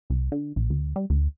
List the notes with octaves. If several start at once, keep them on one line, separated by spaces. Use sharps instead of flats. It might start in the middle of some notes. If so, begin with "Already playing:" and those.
C2
D3
A#1
D2
G3
D2